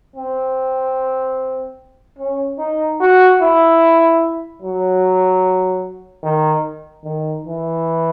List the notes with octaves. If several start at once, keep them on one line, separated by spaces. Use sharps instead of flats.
C4
C#4
D#4
F#4
E4
F#3
D#3
D#3
E3